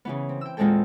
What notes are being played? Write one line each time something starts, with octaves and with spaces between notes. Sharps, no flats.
C#3 E3 B3
C4
G5 E6
E2 A#2 G#3 C4 A4 G5